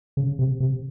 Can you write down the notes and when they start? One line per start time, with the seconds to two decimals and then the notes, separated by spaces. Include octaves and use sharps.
0.17 C#3
0.39 C3
0.60 C3